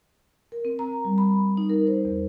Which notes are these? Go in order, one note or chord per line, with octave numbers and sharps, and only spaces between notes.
A#4
C4
A#5
G3
B5
D#4
A#4
C5
E2